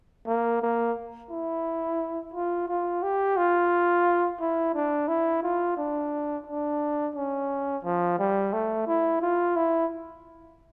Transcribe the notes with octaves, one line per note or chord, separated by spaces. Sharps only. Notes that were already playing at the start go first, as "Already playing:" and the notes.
A#3
A#3
E4
F4
F4
G4
F4
E4
D4
E4
F4
D4
D4
C#4
F3
G3
A3
E4
F4
E4